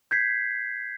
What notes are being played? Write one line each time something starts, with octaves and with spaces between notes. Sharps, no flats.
G6 G#6 B6 C7